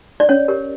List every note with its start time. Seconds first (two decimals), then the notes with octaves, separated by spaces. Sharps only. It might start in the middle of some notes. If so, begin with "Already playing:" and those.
0.20 D5
0.29 C#4 C#5
0.48 G4 A#4 C#5